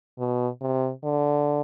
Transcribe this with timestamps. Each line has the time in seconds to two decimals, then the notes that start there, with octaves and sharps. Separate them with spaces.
0.19 B2
0.61 C3
1.03 D3